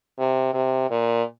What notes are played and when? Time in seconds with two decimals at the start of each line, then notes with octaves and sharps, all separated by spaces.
0.18 C3
0.54 C3
0.90 A#2